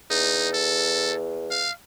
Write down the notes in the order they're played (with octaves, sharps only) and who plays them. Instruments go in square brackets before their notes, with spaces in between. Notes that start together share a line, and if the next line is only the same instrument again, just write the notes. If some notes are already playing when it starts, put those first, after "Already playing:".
[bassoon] E2 [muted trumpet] D#4
[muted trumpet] A4
F5